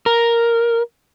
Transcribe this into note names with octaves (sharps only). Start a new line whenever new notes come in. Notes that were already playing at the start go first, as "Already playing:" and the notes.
A#4